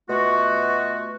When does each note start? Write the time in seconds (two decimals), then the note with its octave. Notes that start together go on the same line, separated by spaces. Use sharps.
0.10 B2 A3 F4 F#4